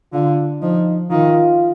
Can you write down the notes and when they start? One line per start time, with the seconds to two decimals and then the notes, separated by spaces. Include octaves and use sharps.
0.13 D3 F4
0.62 F3 D#4
1.11 D#3 F4